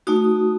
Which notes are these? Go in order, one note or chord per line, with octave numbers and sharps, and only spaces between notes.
A3 D#4 F#4 D#6